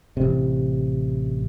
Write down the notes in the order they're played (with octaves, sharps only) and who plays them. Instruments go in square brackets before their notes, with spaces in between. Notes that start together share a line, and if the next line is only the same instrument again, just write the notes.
[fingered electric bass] A1 C3